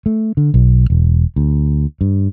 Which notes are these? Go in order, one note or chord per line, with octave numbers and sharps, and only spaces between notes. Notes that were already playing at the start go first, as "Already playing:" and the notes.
A3
D3
B1
E1
D2
G2